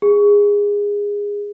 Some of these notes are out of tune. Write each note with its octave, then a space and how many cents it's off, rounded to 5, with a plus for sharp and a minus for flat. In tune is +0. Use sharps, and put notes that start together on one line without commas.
G#4 -20